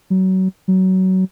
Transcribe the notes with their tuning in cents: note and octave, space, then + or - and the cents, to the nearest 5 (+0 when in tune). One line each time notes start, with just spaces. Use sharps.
F#3 +25
F#3 +20